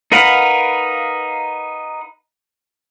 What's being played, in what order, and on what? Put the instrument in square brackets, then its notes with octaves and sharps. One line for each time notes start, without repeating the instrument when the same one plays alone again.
[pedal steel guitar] D#4 A#4 B4 F5 F#5